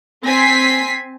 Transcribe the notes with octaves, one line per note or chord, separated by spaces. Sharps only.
C4 G#5 B6 C7